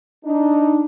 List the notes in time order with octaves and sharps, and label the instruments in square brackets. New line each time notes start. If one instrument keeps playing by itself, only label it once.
[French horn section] D4 D#4